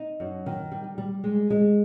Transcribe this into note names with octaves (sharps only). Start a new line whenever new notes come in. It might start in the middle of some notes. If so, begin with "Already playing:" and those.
Already playing: D#4
F#2
D#3
G3
G3
G#3
G#3